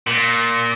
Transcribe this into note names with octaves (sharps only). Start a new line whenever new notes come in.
A#2